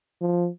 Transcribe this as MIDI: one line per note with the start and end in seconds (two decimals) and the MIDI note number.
0.21 0.48 53